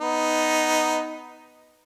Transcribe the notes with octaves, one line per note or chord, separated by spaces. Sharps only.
B3 D#4